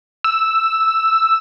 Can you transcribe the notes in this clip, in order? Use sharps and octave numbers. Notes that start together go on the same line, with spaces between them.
E6